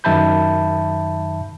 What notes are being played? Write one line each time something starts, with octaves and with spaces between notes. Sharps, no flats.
F#2 D#3 E5 A5 B5 G6